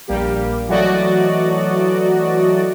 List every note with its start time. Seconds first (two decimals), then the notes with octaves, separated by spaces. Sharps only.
0.08 A#1 G3 A#3 G4
0.68 E3 F#3 A3 F#4 D5 D#5